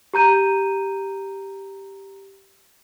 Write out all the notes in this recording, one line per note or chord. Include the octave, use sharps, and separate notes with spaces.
G4 A#5 G6 D#7